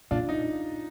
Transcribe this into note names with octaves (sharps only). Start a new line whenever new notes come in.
A#2 D4 F4
D#4